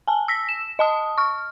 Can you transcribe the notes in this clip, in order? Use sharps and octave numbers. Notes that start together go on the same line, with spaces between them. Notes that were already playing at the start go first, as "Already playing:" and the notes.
G#5 A5
E6 A#6 B6
E7
D#5 A5 D#6
C#6 F6